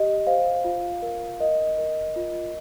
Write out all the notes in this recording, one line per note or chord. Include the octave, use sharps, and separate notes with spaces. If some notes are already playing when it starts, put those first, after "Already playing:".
Already playing: G4 D#5
C5 F5
F4
A#4
A#4 D#5
A#4
F4